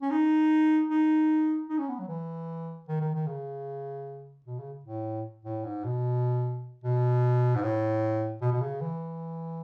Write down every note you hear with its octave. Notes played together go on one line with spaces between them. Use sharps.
C#4
D#4
D#4
D#4
C#4
B3
F#3
E3
D#3
D#3
D#3
C#3
B2
C#3
A2
A2
G#2
B2
B2
G#2
A2
B2
B2
C#3
E3